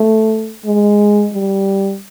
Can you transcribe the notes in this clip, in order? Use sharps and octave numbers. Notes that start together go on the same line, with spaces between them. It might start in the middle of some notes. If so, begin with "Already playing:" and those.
Already playing: A3
G#3
G3